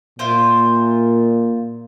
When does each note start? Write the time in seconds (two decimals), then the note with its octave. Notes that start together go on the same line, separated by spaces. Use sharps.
0.19 A#2 E4 F4 C5